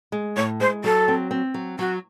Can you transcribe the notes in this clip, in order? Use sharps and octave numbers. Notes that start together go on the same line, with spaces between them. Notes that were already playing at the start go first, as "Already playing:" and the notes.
G#3
A2 C#5
G#3 C5
F#3 A4
C4
C4
F#3
F#3 F#4